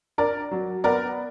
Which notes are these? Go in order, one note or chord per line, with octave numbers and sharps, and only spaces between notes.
D4 A#4 D5
F#3
B3 A#4 D5